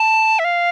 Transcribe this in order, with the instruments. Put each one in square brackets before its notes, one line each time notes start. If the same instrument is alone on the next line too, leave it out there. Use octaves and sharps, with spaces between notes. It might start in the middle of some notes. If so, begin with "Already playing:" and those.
Already playing: [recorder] A5
E5
F5